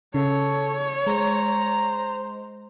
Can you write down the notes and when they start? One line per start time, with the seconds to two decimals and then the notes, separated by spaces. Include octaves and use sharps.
0.14 C#3 A4 C#5
1.07 G#3 C5 A#5